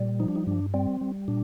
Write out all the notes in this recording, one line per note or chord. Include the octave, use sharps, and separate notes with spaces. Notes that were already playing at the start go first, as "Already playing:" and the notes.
Already playing: A#2 G3
F3 D#4
D4
D#4
G2 D4
G3 C4
G3
A#2 D4